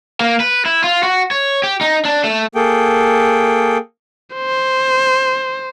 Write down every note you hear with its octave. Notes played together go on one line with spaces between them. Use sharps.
A#3
B4
E4
F4
F#4
C#5
G4
D#4
D4
A3
A#3 G#4 A4 G5
C5